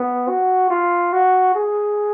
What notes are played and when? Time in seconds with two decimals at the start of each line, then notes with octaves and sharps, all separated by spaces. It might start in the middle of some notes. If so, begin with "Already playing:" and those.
Already playing: B3
0.28 F#4
0.70 F4
1.12 F#4
1.55 G#4